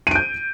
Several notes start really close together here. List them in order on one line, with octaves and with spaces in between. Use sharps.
D#7 D7 G6